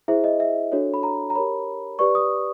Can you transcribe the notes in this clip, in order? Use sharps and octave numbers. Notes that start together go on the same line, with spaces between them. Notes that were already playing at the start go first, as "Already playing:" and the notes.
E4 G#4 C5 E5
D#5
E5
D4 F#4 A4 C#5
B5
A#5
A#5
G4 A#4 C#5 B5
G4 B4 D5 C#6
D#6